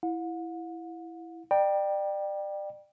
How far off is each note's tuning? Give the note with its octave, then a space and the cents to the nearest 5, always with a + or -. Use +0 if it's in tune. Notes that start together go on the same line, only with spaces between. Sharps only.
E4 +5 F#5 -45
D5 +30 G5 +0 A#5 +45